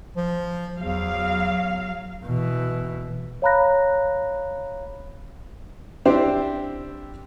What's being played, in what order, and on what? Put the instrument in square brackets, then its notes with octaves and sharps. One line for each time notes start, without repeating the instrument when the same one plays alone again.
[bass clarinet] F3
[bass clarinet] E2 [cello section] F#3 F5
[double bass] B2 E3
[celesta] C#5 F5 A#5 B5 F#6 A#6
[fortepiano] C4 D4 E4 G4 C5